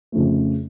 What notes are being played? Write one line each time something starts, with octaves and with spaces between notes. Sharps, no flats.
F2 C#3 F3 A3